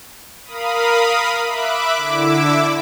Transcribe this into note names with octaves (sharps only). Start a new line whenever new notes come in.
A#4 F5 B5 D#6
E5 B5 D6 F#6
D3 E4 D6 E6